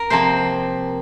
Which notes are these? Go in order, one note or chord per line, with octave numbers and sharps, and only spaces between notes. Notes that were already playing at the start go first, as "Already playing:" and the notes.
Already playing: A#4
C3 F3 A#3 C5